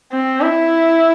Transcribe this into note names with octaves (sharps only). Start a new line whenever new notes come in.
C4
E4